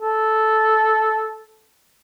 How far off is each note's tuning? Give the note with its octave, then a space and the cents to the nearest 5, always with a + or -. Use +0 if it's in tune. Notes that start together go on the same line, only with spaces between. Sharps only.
A4 -10